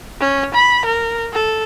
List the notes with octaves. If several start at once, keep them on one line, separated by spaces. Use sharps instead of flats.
C#4
B5
A#4
A4